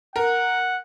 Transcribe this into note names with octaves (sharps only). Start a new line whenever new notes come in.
A#4 F#5